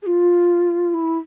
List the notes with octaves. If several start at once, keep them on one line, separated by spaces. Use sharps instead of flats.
G#4
F4
E4